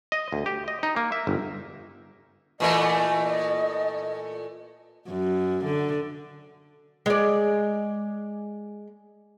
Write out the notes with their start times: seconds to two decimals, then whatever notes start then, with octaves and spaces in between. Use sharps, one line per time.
0.12 D#5
0.33 D2
0.46 G4
0.68 D#5
0.83 D#4
0.96 A#3
1.12 E5
1.27 G1
2.60 A#2 E3 A3 D#5
5.09 F#2
5.65 D3
7.06 G#3 D5